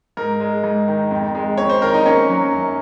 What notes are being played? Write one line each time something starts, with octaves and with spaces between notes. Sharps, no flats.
G#2 A#4
G#3
G#2
D#3
F2
G#3
F2 C#5
C5
D#3 A#4
D#4
A#3 C#4
F#3
F#2